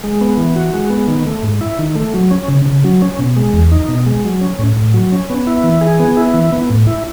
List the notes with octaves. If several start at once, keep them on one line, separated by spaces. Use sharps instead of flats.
G#3
B3
E3
F#4
G#3
B3
D#3
A3
G#2
E4
D#3
A3
F#3
C#4
C#3
C#3
F#3
C#4
B2
G#3
E2
D#4
B2
G#3
F#3
C#4
A2
A2
F#3
C#4
B3
E4
E3
G#4
B3
E4
E3
B3
A2
E4